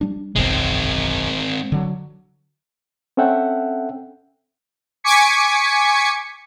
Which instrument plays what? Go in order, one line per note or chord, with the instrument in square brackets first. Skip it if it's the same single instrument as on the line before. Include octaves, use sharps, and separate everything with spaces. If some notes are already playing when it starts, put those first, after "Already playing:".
[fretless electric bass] G3 D4
[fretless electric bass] F#1 B1 E2 [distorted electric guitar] G#3 C4
[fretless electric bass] D3 F#3
[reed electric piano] C4 C#4 A4 E5 F#5 G5
[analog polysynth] G#5 C#6 D6 G#6 B6 C#7